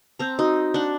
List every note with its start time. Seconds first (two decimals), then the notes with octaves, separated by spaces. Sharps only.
0.19 C4 A5 A#5 G6
0.39 D#4 F#4
0.74 D4 F#5